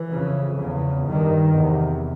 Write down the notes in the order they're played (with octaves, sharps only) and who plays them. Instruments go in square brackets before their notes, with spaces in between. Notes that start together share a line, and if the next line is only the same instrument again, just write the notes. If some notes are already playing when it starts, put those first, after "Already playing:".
Already playing: [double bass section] E3
F2 C#3
E2 C#3
G2 D#3
E2 C3